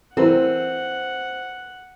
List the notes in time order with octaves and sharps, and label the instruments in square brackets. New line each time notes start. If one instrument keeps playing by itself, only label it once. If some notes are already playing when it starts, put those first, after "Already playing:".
[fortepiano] E3 [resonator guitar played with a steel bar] C4 [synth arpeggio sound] A4 A#4 C5 [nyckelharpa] F#5